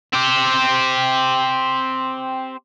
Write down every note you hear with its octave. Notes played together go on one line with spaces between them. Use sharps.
C4 G4